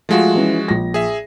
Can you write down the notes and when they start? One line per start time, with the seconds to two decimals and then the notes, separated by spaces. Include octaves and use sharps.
0.09 F3 G#3 A3 F4 F#4
0.35 E3 C#4
0.68 A#1 A#6
0.94 G#4 E5